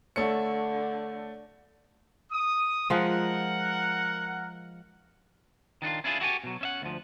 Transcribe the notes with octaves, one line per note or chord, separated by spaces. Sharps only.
D3 A3 C#5 C#7
D#6
F3 G#3 A#4 F#5
D#3 D4 D#4 F4
C#4 D4 E4 F4 G#4
E4 F#4 G4 A4 G#5
B2 F#3
C#4 E5 F#5
D2 F3